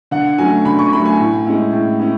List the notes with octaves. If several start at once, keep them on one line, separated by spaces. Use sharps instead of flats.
D3 F#5
F#3 A3 C#4 G#5
D3 B5
C#6
F#3 A3 C#4 B5
G#5
A2
G#3 C#4 E4
A2
C#4 E4